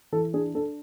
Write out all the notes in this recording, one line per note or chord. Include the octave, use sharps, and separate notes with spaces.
E3 A4
D4 G#4
D4 A4